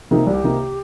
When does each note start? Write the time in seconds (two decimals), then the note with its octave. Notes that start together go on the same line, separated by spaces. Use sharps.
0.11 C3 D#3 A#3 D#4
0.26 C2 G4
0.44 C3 D#3 A#3 D#4